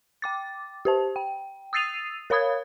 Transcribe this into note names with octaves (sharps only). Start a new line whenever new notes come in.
G5 D6 A6
G4 C5 A5
G5
D#6 E6 A6 C7 D#7 F7
A#4 C#5 F5 B5 D#6 G#6